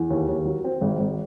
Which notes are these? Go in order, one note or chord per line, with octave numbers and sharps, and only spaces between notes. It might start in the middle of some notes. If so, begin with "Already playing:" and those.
Already playing: E2
D#2
D#2
F#3
C4
G#1
G#1